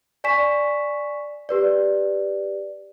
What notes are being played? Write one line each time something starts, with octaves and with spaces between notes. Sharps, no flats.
D5 G#5 C#6 B6 E7
G4 B4 D5